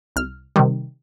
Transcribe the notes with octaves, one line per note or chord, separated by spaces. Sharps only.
C2 F6
C3 D#3 G3